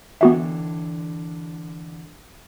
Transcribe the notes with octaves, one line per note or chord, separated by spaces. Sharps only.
D3 E3 B3 D4 F#4 E5